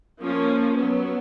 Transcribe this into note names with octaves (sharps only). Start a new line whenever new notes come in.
F3 A#3 C#4
F#3 B3